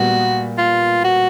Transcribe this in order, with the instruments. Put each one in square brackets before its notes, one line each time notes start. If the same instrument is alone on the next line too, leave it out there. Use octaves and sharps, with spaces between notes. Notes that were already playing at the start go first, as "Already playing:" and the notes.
Already playing: [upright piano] A#2 G3 B3 [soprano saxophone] F#4
[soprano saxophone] F4
F#4